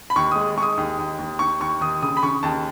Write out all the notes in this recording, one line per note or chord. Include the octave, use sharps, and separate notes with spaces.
B5
D#2 C#6
G#3 D#6
G#3 C#6
D#6
D#2
D#2
D#2
D#2 C#6
D#2 C#6
D#2 D#6
C#3 D#6
B5
C#3 C#6
D#2 A5